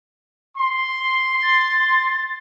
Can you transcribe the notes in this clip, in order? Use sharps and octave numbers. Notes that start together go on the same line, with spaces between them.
C6
A6